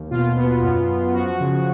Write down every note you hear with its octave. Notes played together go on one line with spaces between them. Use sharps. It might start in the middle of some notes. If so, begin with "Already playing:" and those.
Already playing: D#2
B2 F4
B3
F#2
F#2
F3 F#4
C#3